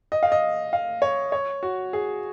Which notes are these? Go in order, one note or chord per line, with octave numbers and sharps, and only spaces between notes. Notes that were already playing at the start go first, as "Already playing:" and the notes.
D#5
F5
D#5
F5
C#5
C#5
F#4
G#4